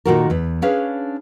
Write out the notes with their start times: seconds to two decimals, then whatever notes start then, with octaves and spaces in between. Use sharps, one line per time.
0.05 A#2 D#3 F4 F#4 A4 A#4
0.30 E2 B4
0.62 C#4 D4 G#4 B4 C#5 F5